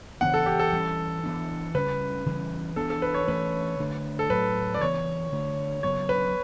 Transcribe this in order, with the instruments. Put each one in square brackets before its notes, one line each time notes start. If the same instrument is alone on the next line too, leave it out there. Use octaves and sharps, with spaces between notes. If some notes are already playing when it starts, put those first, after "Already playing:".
[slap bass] C#3 E3 B3 D4 [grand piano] F#5
[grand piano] A4
G4
A4
[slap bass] E3 G3 C#4
E3 B3 D4
[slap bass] C#3 G3 C#4 [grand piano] B4
[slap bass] C#3 E3 G3 C#4
[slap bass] E3 B3 D4 [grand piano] A4
[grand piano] A4
B4
C#5
[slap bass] E3 A3 C#4 [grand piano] B4
[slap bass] D3 A3 D4
[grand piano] A4
[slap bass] A2 F#3 A3 [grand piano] B4
[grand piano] D5
[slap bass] C#3 E3 B3 [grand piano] C#5
[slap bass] D3 A3 D4
[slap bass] C#3 F#3 B3 [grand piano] C#5
[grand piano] B4